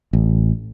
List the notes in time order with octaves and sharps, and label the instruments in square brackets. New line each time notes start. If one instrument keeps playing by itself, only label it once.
[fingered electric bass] A1